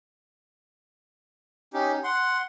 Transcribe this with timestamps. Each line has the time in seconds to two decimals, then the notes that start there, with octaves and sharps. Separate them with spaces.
1.74 C#4 D#4 G4
2.04 F#5 C6